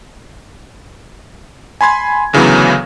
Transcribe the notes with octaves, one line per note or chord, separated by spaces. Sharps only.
G#5 B5 C6 G#6
D2 C#3 E3 F#3 B3